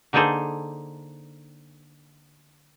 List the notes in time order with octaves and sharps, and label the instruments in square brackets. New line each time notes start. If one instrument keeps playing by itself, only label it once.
[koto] D3 A#3 D#4 G#4 A4 C5